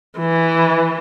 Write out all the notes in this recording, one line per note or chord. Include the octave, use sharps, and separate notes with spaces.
E3